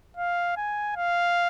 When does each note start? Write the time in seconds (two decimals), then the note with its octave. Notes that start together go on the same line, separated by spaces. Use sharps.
0.17 F5
0.57 G#5
0.96 F5